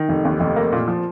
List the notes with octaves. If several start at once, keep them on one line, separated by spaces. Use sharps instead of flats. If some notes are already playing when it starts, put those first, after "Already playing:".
Already playing: D#3
F1
D#2
F1
A#3
A#2
F3